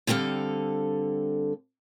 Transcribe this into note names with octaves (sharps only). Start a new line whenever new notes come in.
D3 G3 C4 A4 F5